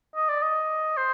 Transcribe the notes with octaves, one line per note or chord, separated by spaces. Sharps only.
D#5
D5
D#5
C5